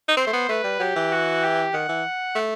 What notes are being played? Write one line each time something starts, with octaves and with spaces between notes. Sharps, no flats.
D#4
C4 C5
A3
B3
A3 B4
G3
F#3 G4
E3
F#4
G4
D#3 F#5
E3
A3